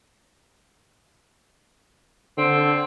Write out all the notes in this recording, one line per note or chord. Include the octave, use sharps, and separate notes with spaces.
D3 C4